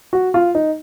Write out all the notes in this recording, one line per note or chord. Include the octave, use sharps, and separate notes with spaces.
F#4
F4
D#4